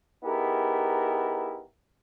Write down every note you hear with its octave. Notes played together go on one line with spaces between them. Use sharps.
B3 D#4 E4 G4 G#4 A#4